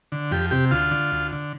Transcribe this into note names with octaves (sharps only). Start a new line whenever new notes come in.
D3
F2 G4
C3 G4
D2 F4
D3
D2
D3